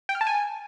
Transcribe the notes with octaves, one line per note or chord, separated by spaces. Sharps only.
G5
F6
A5
G#5